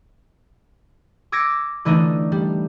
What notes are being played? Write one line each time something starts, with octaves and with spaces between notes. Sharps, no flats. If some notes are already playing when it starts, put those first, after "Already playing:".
D6 E6 G#6 A#6 C#7 D7
D3 E3 A3 D4 D#4
G3